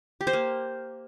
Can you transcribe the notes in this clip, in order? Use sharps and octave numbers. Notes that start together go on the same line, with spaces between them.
G4
C5
A#3